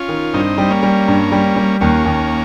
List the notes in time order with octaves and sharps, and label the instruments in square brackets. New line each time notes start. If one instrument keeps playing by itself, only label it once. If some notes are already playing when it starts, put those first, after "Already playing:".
Already playing: [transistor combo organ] C#4 F4
[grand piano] D#3
[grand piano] G2 [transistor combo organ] C4 D#4
[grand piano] G3
[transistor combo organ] A#3 C#4
[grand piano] G3
G2
G3
G3
[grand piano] D#2 [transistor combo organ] A#3 C#4
[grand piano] D#2